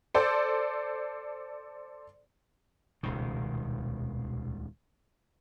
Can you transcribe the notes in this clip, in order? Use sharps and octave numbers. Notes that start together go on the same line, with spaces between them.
A4 C5 D5
D#1 C#2 B2 D#3 C5